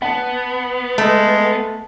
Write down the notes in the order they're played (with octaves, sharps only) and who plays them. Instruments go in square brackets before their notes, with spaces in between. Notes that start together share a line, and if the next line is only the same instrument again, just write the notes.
[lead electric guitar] B3 [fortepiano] F#5 A5
[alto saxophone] G#3 [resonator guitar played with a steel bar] A3